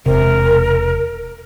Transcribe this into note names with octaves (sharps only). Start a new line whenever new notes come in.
E1 C3 A#4